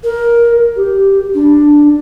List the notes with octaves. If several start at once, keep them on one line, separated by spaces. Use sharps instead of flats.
A#4
G4
D4